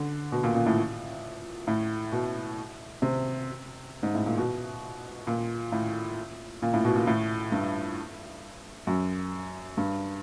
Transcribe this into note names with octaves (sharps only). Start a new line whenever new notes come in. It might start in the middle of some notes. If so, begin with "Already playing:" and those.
Already playing: D3
B2
A#2
A#2
A2
A2
B2
C3
G#2
A2
A#2
B2
A#2
A2
A#2
A2
B2
A#2
A2
G2
F#2
G2